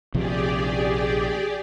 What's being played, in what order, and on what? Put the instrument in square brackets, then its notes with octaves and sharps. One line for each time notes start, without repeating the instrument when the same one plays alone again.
[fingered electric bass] A#1 C3 F3 [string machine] G4 G#4 D5